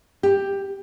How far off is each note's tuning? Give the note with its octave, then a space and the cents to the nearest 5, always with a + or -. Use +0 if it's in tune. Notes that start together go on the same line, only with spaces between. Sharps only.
G4 +10